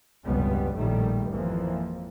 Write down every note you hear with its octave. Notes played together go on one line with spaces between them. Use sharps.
F1 C#2 G2 B2 G3 B3
A#1 A2 D#3 G3 A3
G#1 F2 E3 F3 A#3